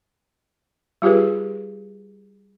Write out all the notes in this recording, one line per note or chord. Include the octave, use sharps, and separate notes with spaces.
G3 F4 G4 G#4 B4